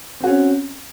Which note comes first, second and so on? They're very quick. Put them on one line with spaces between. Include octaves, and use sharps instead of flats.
C4 F#4 C#4